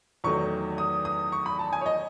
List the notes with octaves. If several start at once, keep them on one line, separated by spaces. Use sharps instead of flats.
E2 D#3 F#3 A3 C#6
D#6
D#6
C#6
B5
A5
G#5
C#5
D#5